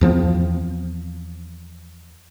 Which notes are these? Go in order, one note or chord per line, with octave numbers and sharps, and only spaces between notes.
E2 F3 A3 C4